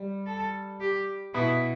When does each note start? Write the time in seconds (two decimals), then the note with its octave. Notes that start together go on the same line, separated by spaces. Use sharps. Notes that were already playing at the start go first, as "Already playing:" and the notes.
Already playing: G3
0.26 A4
0.80 G4
1.34 B2 B3 E4